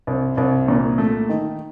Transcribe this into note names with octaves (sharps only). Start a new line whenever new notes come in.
C2
C2
A#2
A3
D#3